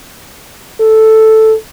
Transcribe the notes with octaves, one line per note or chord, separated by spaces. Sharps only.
A4